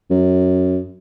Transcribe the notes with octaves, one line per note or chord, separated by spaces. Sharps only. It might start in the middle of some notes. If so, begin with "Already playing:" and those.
F#2